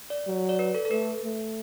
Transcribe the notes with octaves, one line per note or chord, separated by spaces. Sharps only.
D5
F#3
D5
B4
A4
A4
A3 B4
A3